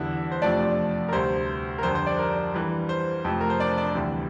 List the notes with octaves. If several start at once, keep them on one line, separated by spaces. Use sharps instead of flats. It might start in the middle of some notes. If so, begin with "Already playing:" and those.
Already playing: E2 D3 G3 E4 E5
C5
F2 C3 F3 A3 D4 D5
A#4
D2 C3 G3 C5
A#4
F2 D3 G3 C5
C5
D4 D5
A#4
G2 E3 G3
C5
F2 C3 F3 A3
A#4
C5
D4 D5
D4 D5
D2 C3 E3 G3